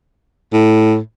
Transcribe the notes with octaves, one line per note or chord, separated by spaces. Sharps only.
A2